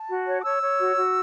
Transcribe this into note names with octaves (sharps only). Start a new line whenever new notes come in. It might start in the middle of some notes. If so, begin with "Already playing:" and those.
Already playing: A5
F#4
C#5
D6
C#5 E6
C#5
F#4
F#4